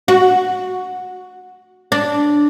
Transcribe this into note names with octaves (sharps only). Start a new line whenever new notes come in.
F#4
D4